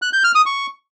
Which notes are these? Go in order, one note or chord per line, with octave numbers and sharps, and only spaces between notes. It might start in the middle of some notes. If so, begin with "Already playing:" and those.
F#6
G6
F6
D#6
C#6